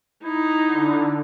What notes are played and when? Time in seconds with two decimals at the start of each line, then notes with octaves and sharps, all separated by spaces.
0.24 D#4 E4
0.68 D3